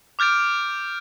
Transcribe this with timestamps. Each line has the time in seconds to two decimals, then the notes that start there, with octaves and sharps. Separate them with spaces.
0.19 D6 F6 G6 A6 D7